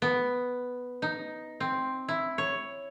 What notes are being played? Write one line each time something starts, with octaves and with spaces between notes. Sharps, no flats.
B3
D#4
C4
E4
C#5